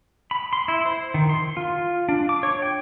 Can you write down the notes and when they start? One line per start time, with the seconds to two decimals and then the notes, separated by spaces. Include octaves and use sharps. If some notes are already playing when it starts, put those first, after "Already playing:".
0.31 B5
0.53 C6
0.68 E4
0.85 C5
1.14 D#3
1.29 C6
1.57 F4
2.09 D4
2.29 D6
2.43 C#5
2.62 G5